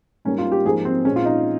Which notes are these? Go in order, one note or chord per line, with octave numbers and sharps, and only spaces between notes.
G#2 G3 A#3 C#4
F4
G4
G#2 F3 A#3 G#4
C4
A#2 G#3 C4 C#4
F4
D#4